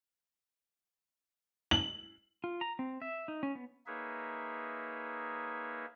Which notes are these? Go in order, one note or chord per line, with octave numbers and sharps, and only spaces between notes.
F#7
F4
A#5
C4
E5
D#4
C#4
B3
A#3 D#4 G#4 B4 C#5 E5